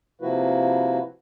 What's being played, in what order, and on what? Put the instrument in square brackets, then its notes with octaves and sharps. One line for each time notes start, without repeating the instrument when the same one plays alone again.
[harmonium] C3 F3 A#3 E4 F#4 B4